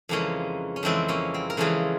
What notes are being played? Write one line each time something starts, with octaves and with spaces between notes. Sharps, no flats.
F2 C#3 E3 G#3 A#3 C#4
C#4
F2 C#3 E3 G#3 C4 E4
A#3 C#4
C4
A#4
F2 C#3 E3 G#3 F4 G#4